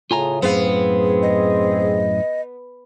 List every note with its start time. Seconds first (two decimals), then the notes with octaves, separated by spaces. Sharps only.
0.11 A2 C#3 F4 G#5 A#5
0.42 F#2 A2 B3 C4 G#4 F5
1.22 D#5